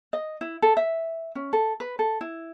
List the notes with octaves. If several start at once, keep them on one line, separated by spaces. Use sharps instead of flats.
D#5
E4
A4
E5
C#4
A4
B4
A4
E4